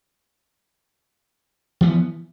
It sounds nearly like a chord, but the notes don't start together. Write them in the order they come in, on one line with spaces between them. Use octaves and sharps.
E3 B3 F3